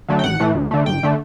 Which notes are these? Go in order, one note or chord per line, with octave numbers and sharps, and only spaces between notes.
D3 F#3 A3
G5
A1 F#5
A2 E3 A3
D2
D3 A3
G1 G5
D3 A3